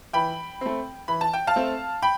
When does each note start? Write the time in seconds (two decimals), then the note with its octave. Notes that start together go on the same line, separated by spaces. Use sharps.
0.13 E3 G5 B5
0.61 A3 C4
1.08 E3 B5
1.21 A5
1.33 G5
1.47 F5 A5
1.56 A3 C4
2.02 G5 B5